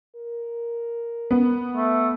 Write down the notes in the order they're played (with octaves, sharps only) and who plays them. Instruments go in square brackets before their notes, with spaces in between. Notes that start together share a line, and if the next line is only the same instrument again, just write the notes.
[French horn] A#4
[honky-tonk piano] B3
[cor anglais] A3